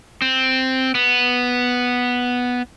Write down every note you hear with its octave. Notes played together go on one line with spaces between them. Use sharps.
C4
B3